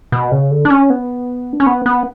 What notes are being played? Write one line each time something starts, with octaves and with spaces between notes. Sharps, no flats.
B2
C#3
D3
D4
C#4
B3
D4
C#4
B3
B3